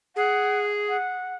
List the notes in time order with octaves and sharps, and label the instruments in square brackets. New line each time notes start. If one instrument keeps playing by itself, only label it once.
[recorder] G#4 [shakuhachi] F#5
[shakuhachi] F#5